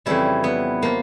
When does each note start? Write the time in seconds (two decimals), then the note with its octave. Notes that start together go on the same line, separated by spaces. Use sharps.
0.06 F2 C#3 E3 G3 E4
0.44 B3
0.83 F3 A#3